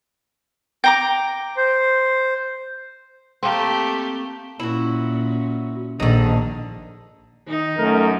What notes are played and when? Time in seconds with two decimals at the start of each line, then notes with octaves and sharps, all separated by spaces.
0.84 G5 A#5 D6
1.57 C5
3.43 A3 A#3 C4 G4
4.60 A#2 C#4 E4 F#4
6.00 A#1 D3 D#3 D#4
7.48 D#3 D#4
7.78 F#2 A3 A#4